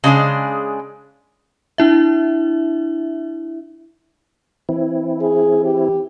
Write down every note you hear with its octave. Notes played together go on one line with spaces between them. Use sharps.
C#3 G#3 D4 G#4
D4 E4 E5
E3 C4 E4
G#4
G4